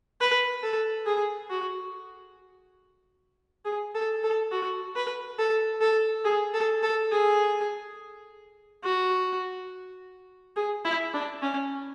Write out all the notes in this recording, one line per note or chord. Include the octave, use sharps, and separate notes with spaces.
B4
A4
G#4
F#4
G#4
A4
A4
F#4
B4
A4
A4
G#4
A4
A4
G#4
F#4
G#4
E4
D4
C#4